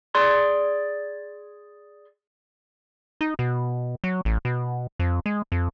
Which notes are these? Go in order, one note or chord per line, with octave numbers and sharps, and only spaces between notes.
G#4 D5 C6
D#4
B2
F#3
A1
B2
F2
G#3
F2